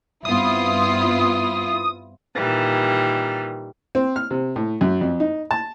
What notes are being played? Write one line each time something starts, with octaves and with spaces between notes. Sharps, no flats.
G2 B3 C4 E4 F4 D#6
A#2 D#3 E3 G3
C4
F6
C3
A2
F#2
F2
D#4
A5